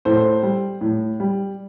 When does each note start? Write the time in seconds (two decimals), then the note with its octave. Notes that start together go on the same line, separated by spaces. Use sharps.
0.05 A2 A4 C5
0.43 G3
0.81 A2
1.20 G3